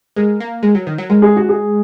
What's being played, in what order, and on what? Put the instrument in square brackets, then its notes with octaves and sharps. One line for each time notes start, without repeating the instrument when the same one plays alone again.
[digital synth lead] G#3 [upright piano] A#4
[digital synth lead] A#3
G#3
F#3
D#3
F#3
[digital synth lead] G#3 [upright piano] A#4
[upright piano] G#4
F#4
G#4